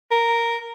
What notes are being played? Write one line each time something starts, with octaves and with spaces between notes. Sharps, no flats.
A#4